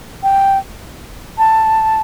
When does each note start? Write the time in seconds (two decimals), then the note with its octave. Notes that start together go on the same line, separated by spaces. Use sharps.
0.23 G5
1.38 A5